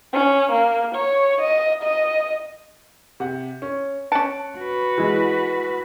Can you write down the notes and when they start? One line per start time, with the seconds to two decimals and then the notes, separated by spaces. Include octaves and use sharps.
0.13 C#4
0.52 A#3
0.95 C#5
1.41 D#5
1.83 D#5
3.20 C3 F#5
3.62 C#4
4.12 C#4 A5 F#6 C#7 D7
4.58 F#4 B4
4.98 E3 G#3